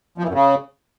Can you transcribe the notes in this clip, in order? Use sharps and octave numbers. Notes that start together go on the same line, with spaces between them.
F3
E3
F#2
C#3